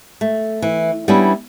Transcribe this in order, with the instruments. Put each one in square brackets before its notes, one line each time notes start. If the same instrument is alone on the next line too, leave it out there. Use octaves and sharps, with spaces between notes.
[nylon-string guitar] A3
E3
G3 B3 C#4 D4 E4